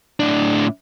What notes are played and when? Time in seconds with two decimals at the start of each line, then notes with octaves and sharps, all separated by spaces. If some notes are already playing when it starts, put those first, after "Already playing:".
0.20 A2 D4